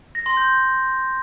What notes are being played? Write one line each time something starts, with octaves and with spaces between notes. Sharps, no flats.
A#6
C6
G6